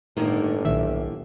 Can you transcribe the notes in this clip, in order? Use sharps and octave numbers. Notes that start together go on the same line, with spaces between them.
G1 A2 D3 D#3 A#3
B1 A#2 D#3 E5